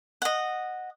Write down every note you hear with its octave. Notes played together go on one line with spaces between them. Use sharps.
D#5 F#5